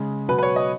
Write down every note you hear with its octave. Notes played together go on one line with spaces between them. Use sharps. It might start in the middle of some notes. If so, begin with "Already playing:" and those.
Already playing: C#3 G#3
B2 F#3 B4
B4
C#5
D#5